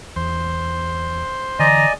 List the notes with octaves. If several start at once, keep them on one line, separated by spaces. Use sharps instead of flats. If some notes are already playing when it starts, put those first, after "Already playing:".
E2 C5
D3 E3 D5 D#5 G#5 A#5